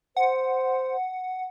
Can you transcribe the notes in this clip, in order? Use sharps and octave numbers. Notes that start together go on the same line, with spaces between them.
C5 F#5